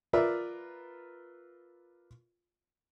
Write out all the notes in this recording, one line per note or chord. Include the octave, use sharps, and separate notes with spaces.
F4 A#4 B4 D5 E5